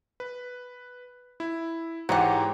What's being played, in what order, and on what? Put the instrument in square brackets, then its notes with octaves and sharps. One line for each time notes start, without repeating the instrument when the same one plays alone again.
[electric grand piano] B4
E4
[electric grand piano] G#2 E3 A#5 [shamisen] F#4 F#5 [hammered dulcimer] G4 C5 C#5